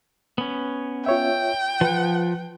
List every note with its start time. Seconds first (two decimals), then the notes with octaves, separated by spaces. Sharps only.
0.38 B3 C#4
1.06 F4 C#5 E5 G5
1.81 F3 B4 F#5